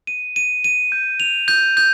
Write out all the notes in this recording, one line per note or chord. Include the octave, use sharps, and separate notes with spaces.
D#7
D#7
D#7
G6
F7
G6
G6